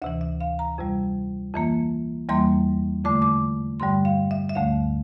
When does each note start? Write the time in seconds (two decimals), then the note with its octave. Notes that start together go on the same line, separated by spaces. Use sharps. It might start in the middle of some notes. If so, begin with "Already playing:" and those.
0.02 D2 C3 E3 E5
0.21 E5
0.40 F5
0.59 A#5
0.78 F2 C3 G3
1.54 F2 E3 A#3
2.29 E2 E3 G3 A#3 C6
3.05 F2 D3 A3 D6
3.22 D6
3.80 G2 D3 G3 C6
4.05 F5
4.31 E5
4.49 E5
4.55 D2 D3 A3 F5